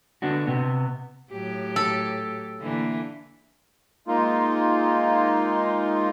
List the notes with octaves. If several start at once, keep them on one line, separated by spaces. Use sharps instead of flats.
D3 B3 D4 F#4
C3 B3
A2 F#3 G4
A4
D3 E3 A#3
G#3 A#3 D#4 F4